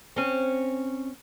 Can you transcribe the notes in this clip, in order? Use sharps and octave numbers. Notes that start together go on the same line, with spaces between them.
C4 C#4